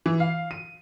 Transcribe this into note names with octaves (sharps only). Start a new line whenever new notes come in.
E3
F5
D#7